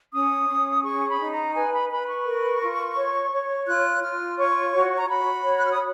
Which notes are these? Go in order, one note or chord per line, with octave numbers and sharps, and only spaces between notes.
C#4 D#6
C#4
G#4 C#6
B5
D#4
A#5
B4 G#5
B5
B4 B5
C#6
A#4
F4
C#5
C#5
F4 F#6
F4 F6
C#5 C#6
F#4
A#5
F#4 B5
C#5
F#6
F6
D#6